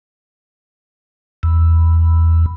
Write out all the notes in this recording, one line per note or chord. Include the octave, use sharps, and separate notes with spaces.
E2